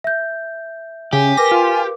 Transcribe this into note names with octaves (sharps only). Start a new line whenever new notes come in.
E5 G6
C#3 G4 G#5
A#4 B4 D6 A#6
F4